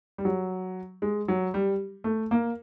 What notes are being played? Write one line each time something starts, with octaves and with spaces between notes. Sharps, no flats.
G3
F#3
G#3
F#3
G3
A3
A#3